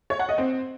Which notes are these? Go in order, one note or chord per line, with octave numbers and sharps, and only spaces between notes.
C#5
F#5
D#5
C4